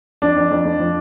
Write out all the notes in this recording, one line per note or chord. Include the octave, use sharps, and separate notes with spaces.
F2 D4
F2
F2
F2
F3